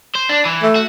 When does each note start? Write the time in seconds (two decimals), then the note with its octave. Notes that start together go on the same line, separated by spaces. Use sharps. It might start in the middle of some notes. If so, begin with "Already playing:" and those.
0.15 C5
0.30 D4
0.45 E3
0.63 A3
0.76 F#4